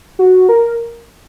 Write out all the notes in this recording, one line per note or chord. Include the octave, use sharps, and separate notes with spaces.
F#4
A#4